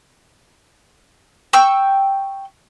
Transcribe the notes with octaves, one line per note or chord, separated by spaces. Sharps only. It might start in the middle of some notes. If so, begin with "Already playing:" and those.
G5 C#6 E6